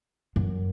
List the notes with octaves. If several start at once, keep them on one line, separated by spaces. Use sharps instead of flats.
F#2